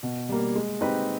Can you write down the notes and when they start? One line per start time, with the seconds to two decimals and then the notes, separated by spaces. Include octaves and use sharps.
0.03 B2
0.29 G3 A#3
0.55 G#3
0.81 C4 D#4 G4 B4